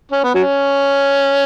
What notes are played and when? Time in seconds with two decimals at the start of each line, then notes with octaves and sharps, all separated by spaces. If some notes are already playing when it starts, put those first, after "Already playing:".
0.12 C#4
0.24 B3
0.35 F#3 C#4